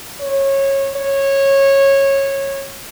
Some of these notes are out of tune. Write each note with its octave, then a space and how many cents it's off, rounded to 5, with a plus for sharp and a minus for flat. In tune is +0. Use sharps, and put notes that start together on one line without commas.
C#5 -20
C#5 -15